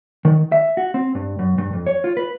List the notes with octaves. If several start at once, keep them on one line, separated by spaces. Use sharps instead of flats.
D#3
E5
F#4
C4
G2
F#2
G2
F2
C#5
F4
B4